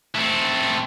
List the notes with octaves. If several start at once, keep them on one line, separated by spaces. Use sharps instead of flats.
A3 C4